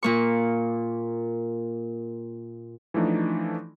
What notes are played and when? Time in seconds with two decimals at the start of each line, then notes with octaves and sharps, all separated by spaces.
0.03 A#2 A#3 C#6
2.94 E3 F3 A3 D4 D#4